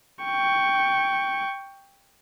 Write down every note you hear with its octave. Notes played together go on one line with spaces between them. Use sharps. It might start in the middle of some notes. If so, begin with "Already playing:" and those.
G5 C#6